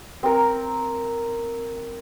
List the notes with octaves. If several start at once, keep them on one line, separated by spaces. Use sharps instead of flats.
C4 A#4